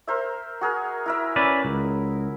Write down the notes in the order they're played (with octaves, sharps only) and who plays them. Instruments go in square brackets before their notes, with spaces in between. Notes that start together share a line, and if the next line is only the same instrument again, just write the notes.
[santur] A#4 C5 E5
F#4 G#4 A#4
E4 A#4 E5
[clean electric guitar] C#4 B4 D5
C#2